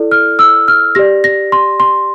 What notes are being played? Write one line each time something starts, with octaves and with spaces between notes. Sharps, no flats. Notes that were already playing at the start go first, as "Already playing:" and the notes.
Already playing: E4 A4 D5
F6
E6
F6
G4 D5 A#6
A#6
C6
C6